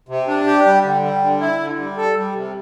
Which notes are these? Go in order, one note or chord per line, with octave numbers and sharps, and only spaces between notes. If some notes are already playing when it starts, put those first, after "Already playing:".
C3
D4
G4
G3
D3
G3
D3
E4
D3
G3
A4
G3
C3